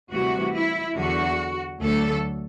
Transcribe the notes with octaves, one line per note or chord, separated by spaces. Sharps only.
D2 C3 E3 G3 F#4
E4
E2 D3 F#3 F#4
D2 D3 F#3 A3 A4